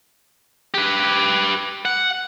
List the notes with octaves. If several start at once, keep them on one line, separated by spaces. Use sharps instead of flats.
G4 B4
F#5